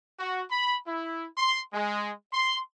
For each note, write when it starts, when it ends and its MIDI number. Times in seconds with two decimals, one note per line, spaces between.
0.19 0.41 66
0.51 0.76 83
0.86 1.26 64
1.38 1.59 84
1.73 2.11 56
2.33 2.59 84